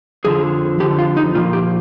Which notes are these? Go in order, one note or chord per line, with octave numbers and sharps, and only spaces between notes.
F2 D3 F3 G#4
F2 D3 F3 G4
F4
D#4
A#2 F3 F4
G4